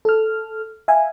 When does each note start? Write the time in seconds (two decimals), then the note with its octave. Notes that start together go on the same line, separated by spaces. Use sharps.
0.05 A4 F6
0.88 E5 F5 G#5